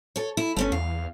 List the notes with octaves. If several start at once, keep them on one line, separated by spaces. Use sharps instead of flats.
A4 C#5
E4
G1 A3 C4 C#4
E2 F5